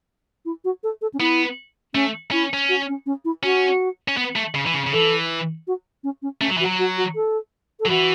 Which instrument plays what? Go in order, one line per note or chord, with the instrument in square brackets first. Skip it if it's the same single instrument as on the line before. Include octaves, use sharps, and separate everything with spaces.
[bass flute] E4
F#4
A4
A4
C#4
[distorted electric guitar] B3 [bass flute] E4
[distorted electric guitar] A3 [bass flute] C#4
[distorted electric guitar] C#4 [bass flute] E4
[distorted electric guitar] C#4
[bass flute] F#4
C#4
C#4
E4
[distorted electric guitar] C#4 [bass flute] F#4
[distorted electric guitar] C#4
B3
A3
C#3
E3
C#3
C#3
[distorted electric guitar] E3 [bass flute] A4
[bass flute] F#4
C#4
C#4
[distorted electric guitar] A3 [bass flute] C#4
[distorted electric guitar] F#3
E3
[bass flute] F#4
[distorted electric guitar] F#3
[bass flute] F#4
F#4
A4
A4
[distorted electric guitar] F#3
[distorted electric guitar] E3 [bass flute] F#4